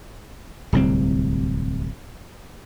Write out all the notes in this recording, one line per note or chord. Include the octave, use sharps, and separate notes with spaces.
D1 C2 C4